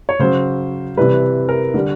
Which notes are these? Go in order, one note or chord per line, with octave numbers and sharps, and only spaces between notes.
C#5
C#3 F#3 C5
C3 E3 G3 B4
A#4
D3 G3